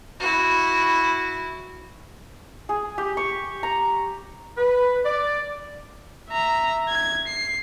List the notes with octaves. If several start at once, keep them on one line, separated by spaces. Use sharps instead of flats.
E4 F#4
G#4
G4
C#6
A#5
B4
D5
E5 A#5
G#6
C7